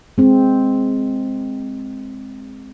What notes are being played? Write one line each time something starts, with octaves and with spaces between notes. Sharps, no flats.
G#3 C4